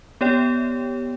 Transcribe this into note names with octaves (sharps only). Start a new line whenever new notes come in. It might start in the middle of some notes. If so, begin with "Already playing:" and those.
B3 G4 C#5 D5 G5